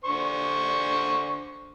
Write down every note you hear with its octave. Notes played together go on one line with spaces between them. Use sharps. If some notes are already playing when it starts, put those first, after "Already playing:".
D3 C5 C#6